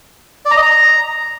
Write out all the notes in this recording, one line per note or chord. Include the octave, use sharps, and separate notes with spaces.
D5
A#5
D#5
A#5